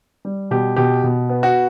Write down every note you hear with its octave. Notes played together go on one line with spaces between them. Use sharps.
G3
B2 G4
B2 G4
B2
B3
F#4